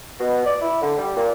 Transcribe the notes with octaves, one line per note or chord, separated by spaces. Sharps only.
B2
D5
E4
D3
G3
A#2